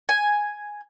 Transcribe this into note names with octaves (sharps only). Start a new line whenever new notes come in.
G#5